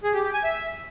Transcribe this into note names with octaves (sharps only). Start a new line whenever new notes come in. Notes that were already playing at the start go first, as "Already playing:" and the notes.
G#4
G4
G4
G#5
E5